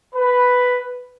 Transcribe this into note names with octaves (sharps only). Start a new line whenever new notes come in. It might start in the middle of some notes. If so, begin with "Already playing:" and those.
B4